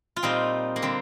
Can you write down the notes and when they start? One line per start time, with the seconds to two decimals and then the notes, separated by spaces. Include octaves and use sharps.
0.16 F4
0.23 A#2 G3 C4 D#4
0.76 A#3
0.82 D3 G3 C4